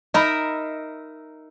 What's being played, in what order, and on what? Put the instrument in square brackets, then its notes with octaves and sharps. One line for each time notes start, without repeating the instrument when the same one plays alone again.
[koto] D#4 A#4 E5 [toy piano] D#5 B5